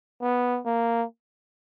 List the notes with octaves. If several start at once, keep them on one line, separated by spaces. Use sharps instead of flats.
B3
A#3